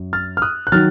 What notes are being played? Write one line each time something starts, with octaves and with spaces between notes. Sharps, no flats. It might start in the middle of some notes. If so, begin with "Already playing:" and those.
Already playing: F#2
F6 A6
F6
D#6 F#6
F#6
D#3 F#3 F6 A6